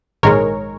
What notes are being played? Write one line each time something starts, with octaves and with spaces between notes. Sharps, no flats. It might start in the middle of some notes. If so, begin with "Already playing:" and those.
A#1 G#2 D#3 G#3 A#4 C#5